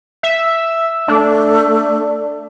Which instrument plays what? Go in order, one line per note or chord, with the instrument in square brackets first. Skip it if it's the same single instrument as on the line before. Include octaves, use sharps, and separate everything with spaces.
[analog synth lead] E5
[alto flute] A3 [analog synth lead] D4